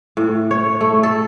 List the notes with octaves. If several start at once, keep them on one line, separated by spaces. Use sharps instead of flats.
A2
C#5
A3
A4